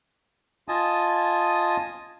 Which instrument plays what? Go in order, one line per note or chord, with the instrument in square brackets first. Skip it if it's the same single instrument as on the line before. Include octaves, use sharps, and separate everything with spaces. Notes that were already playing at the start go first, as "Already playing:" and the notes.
[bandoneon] F4 D#5 G#5 A5 D#6